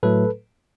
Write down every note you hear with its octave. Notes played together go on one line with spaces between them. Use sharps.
A2 F#3 A3 A4 B4